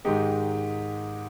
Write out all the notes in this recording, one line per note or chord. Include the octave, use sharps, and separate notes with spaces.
G#2 D#3 G#3 D#4 G4